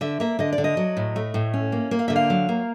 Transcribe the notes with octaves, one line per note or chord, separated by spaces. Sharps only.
D3 E5
A#3 E5
D3 D#5
D5
D3
D#5
F#3
A2
A3
A2
C#4
A#3
A#3
F5
D3 E5
F5
F#3
A#3